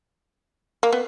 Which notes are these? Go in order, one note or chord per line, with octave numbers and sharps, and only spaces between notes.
A#3
B3